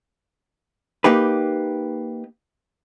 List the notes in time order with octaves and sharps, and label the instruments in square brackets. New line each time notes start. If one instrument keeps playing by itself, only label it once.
[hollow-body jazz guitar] A#3 D#4 G4 B4